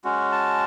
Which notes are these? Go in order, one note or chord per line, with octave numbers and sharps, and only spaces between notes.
G#3 C#4 F#4
A5